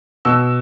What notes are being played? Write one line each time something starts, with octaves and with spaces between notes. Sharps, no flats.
B2 E6